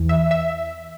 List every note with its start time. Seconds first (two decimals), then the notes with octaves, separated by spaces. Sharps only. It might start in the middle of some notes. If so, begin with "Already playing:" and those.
Already playing: E2 E3
0.09 E5
0.31 E5